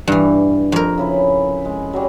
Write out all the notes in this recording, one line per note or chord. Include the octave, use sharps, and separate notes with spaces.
G2 E3
F2 A#4
C#3 E4 B4
G#3
F#3 G3